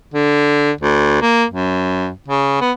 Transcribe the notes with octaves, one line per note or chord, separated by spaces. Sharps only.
D3
D2
A#3
F#2
C#3
B3